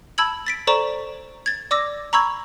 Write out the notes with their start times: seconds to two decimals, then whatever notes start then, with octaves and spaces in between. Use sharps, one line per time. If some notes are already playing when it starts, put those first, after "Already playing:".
0.18 A5 B5 E6 G#6 F#7
0.47 A6 B6 D7
0.67 A4 C5 D5 A#5 C#6 E7
1.46 G#6 A6
1.71 D5 D6 E6 A#6
2.13 A#5 B5 C#6 E6 G#6